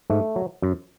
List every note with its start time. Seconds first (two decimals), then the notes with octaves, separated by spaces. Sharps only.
0.10 G#2 A3
0.36 F#3
0.62 F#2